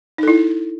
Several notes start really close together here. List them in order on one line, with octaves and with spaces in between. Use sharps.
D#4 A4 E4